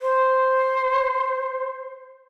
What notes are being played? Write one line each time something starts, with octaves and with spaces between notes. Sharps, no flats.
C5